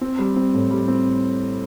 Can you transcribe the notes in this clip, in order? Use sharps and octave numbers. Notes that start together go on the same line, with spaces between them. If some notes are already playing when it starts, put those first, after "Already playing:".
C4
G3
C4
A2
G3
C4